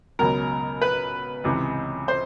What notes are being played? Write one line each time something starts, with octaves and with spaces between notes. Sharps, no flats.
C#2 B2 F#3 A#4
B4
C#2 C3 E3
C5